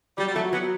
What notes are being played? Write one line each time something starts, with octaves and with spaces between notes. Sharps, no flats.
F#3 G3
G3
F#3 A3
F#3 B3